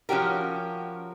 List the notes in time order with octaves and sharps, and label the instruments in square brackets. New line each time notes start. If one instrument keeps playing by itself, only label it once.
[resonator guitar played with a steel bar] F3 C#4 F#4 G4 A#4